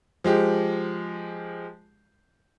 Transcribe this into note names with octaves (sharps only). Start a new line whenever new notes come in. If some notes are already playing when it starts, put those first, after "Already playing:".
F3 G#3 G4